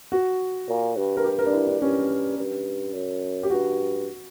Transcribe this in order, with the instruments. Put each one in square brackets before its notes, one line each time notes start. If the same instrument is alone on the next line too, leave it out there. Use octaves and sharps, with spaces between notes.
[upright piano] F#4
[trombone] A#2
G2
[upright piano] A#4
G4
A#4
D4
E4
D4
[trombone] G2 [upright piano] C#4
[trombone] G2
F#2
[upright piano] G4
[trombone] G2 [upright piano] F#4